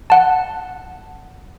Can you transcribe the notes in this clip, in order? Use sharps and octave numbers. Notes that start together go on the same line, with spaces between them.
F#5 A5